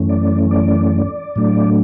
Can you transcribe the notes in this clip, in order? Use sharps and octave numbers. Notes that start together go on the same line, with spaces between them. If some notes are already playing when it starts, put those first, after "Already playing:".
Already playing: F#2 E3 A3 C#4
D5
D5
A2 F#3 A3 D4